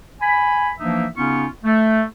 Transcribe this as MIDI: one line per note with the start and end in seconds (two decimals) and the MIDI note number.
0.21 0.70 80
0.21 0.70 83
0.79 1.05 52
0.79 1.05 53
0.79 1.05 58
0.79 1.05 62
0.79 1.05 63
0.79 1.05 76
1.17 1.46 49
1.17 1.46 59
1.17 1.46 61
1.17 1.46 63
1.17 1.46 65
1.17 1.46 85
1.64 2.03 57